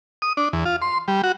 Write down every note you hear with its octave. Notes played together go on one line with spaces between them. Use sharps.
D#6
D4
E2
F4
C6
G3
F#4